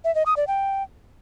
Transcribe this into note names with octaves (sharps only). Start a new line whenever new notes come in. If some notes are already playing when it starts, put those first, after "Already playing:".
E5
D#5
D#6
D5
G5